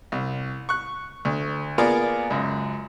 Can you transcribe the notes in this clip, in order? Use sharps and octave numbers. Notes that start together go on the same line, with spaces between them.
C2
C#6 F#6
D2
A#3 B3 F4 G#4 A#4 D5
C#2 F#2